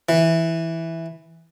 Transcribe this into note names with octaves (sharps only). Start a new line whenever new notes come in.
E3